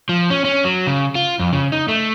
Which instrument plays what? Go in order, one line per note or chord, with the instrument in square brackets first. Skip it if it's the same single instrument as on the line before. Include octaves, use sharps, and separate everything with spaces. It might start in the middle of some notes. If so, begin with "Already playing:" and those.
[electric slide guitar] F3
C#4
C#4
F#3
C#3
F4
F2
C#3
D#4
A3